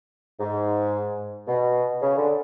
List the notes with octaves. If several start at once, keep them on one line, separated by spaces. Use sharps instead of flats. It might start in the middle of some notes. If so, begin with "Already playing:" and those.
G#2
B2
C#3
D3